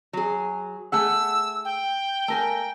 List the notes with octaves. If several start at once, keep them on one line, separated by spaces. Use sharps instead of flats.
F#3 G#4
A3 G#4 F#5 E6
G5
A3 A#4 G#5